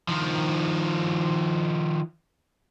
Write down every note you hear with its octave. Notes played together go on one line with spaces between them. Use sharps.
D#3 F3